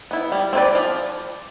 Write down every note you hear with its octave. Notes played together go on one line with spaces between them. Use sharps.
B3 E4
G3
C4 E4 B4 D5
F3